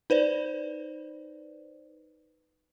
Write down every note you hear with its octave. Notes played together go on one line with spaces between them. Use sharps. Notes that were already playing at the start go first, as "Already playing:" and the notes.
D#4 B4 C5 D5